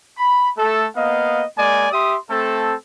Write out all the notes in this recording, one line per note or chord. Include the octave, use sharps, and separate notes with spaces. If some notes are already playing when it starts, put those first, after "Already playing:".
B5
A3 A4
A#3 B3 D#5 F5
G#3 A#3 D5 G#5
G4 E5 C6 D#6
A3 C4 A4